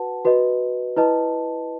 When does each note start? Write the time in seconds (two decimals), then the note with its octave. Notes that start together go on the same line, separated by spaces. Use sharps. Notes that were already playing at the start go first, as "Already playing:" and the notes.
Already playing: F#4 B4 F#5 A5
0.25 F#4 B4 D#5
0.97 E4 B4 D#5 A5